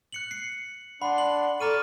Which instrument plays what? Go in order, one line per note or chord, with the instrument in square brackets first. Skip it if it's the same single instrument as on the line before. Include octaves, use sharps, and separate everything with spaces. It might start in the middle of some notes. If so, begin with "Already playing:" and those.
[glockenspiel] F#6 C#7 F#7
C7 C#7
[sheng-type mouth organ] D4 C6 [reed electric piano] F#5 [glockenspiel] B5
[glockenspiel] F#7
[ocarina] A4 [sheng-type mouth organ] D5 C#6 [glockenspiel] A#5 F6 D#7